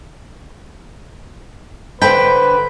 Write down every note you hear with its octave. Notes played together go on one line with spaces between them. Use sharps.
D3 B4 C5 G5 B5